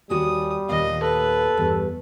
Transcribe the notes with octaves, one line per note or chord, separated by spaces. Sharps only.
D#2 G3 F#4 G#5 D#6
D#2 A#2 D#5 F5
A4 B4
E2 G2